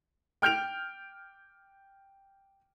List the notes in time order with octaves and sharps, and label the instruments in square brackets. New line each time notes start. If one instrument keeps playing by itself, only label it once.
[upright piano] G5 F6 G6 D7 F7